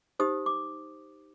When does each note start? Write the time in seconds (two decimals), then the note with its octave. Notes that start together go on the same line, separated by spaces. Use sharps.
0.19 D#4 G4 C5 D#6
0.46 D6